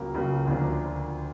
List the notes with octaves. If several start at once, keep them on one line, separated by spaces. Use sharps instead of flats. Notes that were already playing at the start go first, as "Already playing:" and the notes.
Already playing: C#2 C#3 F#3 A#3
C#2 C#3 F#3 A#3
D2 D3 F3 A#3 D4